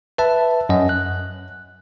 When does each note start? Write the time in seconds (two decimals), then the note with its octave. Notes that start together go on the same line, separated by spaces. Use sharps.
0.18 B4 E5 A5
0.69 F#2 D#5
0.89 F#6